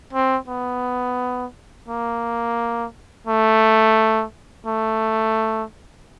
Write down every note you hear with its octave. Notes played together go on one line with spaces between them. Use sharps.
C4
B3
A#3
A3
A3